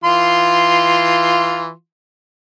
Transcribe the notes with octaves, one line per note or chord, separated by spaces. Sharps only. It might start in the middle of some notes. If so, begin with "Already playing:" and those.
E3 F4 C6